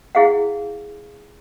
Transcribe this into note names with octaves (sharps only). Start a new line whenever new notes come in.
E4 G#4 F5 F#5